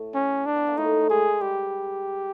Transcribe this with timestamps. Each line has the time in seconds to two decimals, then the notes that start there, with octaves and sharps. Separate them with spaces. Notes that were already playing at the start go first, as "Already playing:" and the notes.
Already playing: A2 A3
0.15 C#4
0.46 D4
0.56 B3
0.67 A#3
0.77 A2 A3 D#4
1.01 A3
1.10 G#3 G#4
1.41 G3 G4